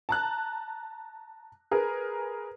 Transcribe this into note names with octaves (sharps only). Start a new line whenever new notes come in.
A5 A#5 F#6
G#4 A#4 B4